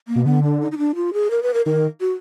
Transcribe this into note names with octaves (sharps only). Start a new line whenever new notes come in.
A#3
B2
D3 B3
D4
D#4
D#4
D4
F4
G#4
A#4
B4
A#4
D#3 A#4
F#4